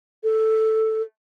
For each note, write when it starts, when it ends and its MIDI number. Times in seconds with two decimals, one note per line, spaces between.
0.23 1.01 69